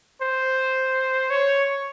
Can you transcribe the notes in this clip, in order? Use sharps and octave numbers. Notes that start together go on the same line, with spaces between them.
C5
C#5